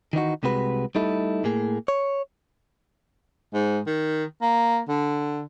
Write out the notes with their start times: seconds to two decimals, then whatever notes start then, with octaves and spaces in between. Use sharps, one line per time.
0.13 D#3 E3 D#4 F#4
0.43 C2 C3 G#3 F#4 B4
0.95 G3 A3 D#4 E4 A4
1.44 A2 A#3 G#4
1.88 C#5
3.54 G#2
3.87 D#3
4.42 A#3
4.89 D3